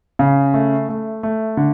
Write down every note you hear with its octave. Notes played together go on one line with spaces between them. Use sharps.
C#3
A3
A3
A3
D3